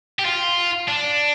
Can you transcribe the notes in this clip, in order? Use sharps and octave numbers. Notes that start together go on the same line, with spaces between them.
G4
F4
D4